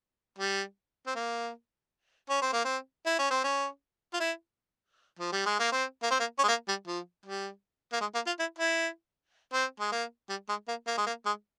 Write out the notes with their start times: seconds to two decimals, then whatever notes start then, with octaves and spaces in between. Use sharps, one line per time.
0.38 G3
1.07 C4
1.15 A#3
2.29 C#4
2.42 C4
2.52 A#3
2.65 C4
3.06 E4
3.18 C#4
3.30 C4
3.44 C#4
4.13 F4
4.20 E4
5.19 F3
5.32 G3
5.46 G#3
5.59 A#3
5.72 C4
6.03 A#3
6.11 C4
6.20 A#3
6.39 C#4
6.44 G#3
6.48 A#3
6.68 G3
6.87 F3
7.25 G3
7.93 A#3
8.00 G#3
8.14 A#3
8.26 F4
8.39 E4
8.59 E4
9.53 C4
9.80 G#3
9.92 A#3
10.29 G3
10.49 G#3
10.68 A#3
10.87 A#3
10.97 G#3
11.06 A#3
11.25 G#3